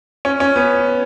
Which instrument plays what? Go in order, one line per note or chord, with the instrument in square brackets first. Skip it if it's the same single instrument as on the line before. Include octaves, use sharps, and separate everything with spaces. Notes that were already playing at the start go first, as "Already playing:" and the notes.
[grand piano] C#4
C#4
B3